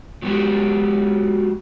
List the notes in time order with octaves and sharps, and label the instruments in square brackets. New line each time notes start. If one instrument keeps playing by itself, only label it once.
[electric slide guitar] F#3 G#3 B3 F#4 G4